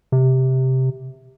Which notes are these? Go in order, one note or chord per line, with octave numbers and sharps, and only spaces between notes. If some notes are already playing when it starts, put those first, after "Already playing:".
C3